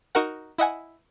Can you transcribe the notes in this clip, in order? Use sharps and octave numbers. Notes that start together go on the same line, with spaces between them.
D#4 F#4 A#4 F#5
E4 D#5 F#5 G#5